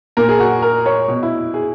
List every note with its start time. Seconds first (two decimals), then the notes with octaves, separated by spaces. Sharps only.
0.17 A#2 A#4
0.29 G#4
0.40 F#4
0.62 A#4
0.86 C#5
1.08 B2
1.23 E4
1.54 G#4